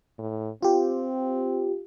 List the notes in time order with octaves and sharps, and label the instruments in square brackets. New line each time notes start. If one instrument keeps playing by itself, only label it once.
[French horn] A2
[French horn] C4 [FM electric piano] F4 G4